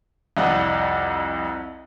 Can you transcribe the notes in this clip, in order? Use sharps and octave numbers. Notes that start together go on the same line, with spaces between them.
C2 F2 D5 D#5 F#5